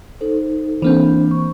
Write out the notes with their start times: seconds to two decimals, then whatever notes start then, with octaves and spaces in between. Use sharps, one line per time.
0.21 D#4 A4 C5
0.82 E3 A#3 C4 D4 C5
1.31 C#6